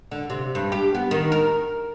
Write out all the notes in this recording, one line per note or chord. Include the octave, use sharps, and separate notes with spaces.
D3
C3
G2
G4
B3
D#3
A#4